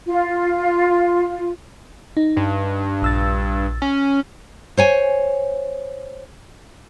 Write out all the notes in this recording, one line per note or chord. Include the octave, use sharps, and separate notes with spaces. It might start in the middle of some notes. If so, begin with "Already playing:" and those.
F4
D#4
G2
A#1 E6 A6
C#4
C5 C#5 G#5